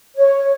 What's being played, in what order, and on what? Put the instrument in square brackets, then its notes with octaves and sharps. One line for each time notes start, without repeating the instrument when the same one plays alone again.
[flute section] C#5